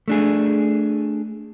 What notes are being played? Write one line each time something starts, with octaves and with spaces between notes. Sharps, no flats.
A3 D4 G#4